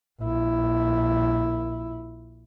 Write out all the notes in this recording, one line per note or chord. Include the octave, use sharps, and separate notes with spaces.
A#1 E4